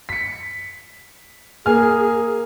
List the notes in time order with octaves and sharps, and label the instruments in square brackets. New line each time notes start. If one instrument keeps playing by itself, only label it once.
[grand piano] B6 C#7
[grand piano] A#3 G#5 F6 [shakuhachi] G#4